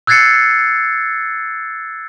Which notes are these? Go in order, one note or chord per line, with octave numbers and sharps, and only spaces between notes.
E6 F#6 G#6 A6 C7 C#7